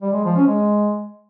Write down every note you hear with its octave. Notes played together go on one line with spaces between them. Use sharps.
G3
G#3
F3
C#4
G#3